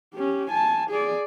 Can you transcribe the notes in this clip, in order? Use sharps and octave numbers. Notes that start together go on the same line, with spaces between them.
C#4 G4
G#5 A5
G#4 D5